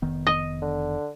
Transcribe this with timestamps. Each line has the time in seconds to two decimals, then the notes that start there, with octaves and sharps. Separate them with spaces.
0.02 F1 D#3 B3
0.27 D#5
0.62 D3